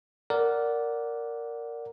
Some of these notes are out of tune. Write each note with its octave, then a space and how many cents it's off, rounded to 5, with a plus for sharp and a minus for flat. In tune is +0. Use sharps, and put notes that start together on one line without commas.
A#4 -5 D5 -10 F#5 +0